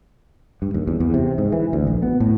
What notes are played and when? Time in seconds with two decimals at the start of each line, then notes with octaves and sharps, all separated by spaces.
0.62 G2
0.74 D#2
0.87 E2
1.00 E2
1.14 C3
1.38 G#2
1.52 E3
1.73 D2
1.87 A#1
2.02 B3
2.20 A2